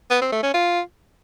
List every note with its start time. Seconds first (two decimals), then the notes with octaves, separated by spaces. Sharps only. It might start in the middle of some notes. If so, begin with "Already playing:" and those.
0.11 B3
0.21 C4
0.32 A3
0.43 C#4
0.54 F4